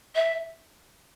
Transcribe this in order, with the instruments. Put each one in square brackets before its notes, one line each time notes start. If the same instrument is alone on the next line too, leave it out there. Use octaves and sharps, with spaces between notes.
[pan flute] E5